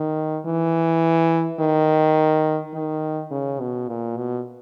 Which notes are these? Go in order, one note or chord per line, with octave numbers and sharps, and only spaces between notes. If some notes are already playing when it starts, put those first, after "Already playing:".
Already playing: D#3
E3
D#3
D#3
C#3
B2
A#2
B2